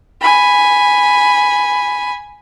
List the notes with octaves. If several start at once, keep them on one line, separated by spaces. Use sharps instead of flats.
G#5 B5